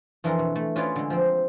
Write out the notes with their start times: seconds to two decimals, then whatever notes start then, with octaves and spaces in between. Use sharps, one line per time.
0.24 F2 E3 D4 F4 A4 A#4
0.39 B2
0.56 A3
0.76 C#4 F4 G#4 B4 C#5 D5
0.96 D3 G#3
1.10 F3 C4